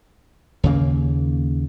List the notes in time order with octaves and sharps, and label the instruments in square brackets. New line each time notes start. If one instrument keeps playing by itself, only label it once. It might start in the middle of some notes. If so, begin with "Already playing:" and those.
[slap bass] D#2 C#3 A#3